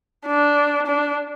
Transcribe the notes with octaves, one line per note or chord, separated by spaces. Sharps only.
D4
D4